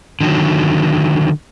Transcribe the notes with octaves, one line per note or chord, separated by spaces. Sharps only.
D3 D#3 F#3